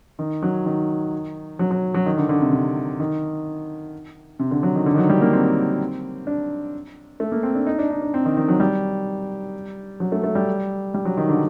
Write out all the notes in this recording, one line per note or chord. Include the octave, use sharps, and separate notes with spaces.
D#3
F#3
D#3
F#3
F#3
F#3
D#3
D3
D3
C3
C3
D#3
C3
D3
F#3
D#3
D3
D#3
F#3
G3
A#3
C4
D4
A3
A#3
C4
D4
D#4
D4
D#4
D4
C4
D#3
D#3
F#3
G3
F#3
A3
A3
G3
G3
F#3
D#3
D3